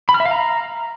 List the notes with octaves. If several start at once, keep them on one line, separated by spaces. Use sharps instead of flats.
B5
F6
E5
F5
A#5